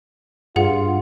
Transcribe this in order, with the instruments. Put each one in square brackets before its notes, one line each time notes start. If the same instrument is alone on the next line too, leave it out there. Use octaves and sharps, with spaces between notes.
[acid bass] G2 [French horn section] F4 [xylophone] G#4 F#5